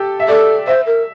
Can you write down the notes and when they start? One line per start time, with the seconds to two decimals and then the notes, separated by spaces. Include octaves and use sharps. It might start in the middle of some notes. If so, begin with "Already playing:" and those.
Already playing: G4 A4
0.20 E5
0.28 A4 D5
0.67 C5 E5
0.86 A#4